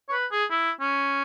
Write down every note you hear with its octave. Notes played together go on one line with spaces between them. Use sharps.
C#5
B4
G#4
E4
C#4